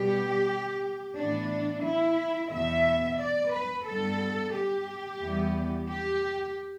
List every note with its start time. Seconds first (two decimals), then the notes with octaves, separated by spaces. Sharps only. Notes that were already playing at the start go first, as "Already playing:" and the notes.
Already playing: B2 G3 B3 G4
1.16 A2 E3 B3 D4
1.85 E4
2.51 E2 B2 B3 E5
3.19 D5
3.53 B4
3.86 G2 G3 B3 A4
4.54 G4
5.21 E2 E3 G3 B3
5.88 G4